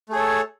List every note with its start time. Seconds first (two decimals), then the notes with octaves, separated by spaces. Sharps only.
0.09 A3
0.12 G#4
0.16 C#5
0.19 A4